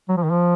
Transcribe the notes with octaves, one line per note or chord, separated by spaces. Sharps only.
F#3
F3
D#3
F3